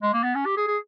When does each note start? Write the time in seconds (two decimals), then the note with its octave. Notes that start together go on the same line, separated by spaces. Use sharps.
0.02 G#3
0.13 A#3
0.23 B3
0.35 C#4
0.46 G4
0.57 G#4
0.68 G#4